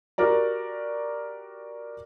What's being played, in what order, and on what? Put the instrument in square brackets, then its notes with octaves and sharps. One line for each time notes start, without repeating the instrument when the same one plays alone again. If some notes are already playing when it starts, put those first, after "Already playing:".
[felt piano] F#4 G4 A#4 D5 A#5